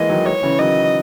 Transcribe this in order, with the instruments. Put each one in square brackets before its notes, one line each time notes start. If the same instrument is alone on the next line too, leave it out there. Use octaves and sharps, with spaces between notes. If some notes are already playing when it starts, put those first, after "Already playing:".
Already playing: [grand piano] E3 G#3 A#3 [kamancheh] D#5
[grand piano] D#3 F#3
[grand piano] E3 G#3 [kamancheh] C#5
[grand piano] C#3 E3
[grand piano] D#3 F#3 [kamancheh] D#5